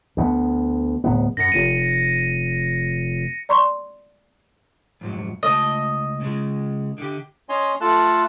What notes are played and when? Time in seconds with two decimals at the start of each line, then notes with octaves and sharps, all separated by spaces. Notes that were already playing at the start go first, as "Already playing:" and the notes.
0.17 D2 B3
1.04 D1 B3
1.37 F#2 A#6 C#7
1.52 F1 D#7
3.49 D5 A#5 C6 C#6
5.01 F2 G#2 F#3
5.43 C#2 A3 D#5 A5
6.21 C#3 G#3
6.98 D3 G4
7.49 C#4 C#5 D#5 G#5 C6
7.81 A3 F4 A4 A5 F#6